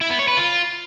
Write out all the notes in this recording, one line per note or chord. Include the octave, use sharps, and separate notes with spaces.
E4
B3
C#5
B4
F4